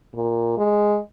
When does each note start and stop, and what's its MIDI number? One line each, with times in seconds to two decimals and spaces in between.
0.15 0.57 46
0.57 0.98 56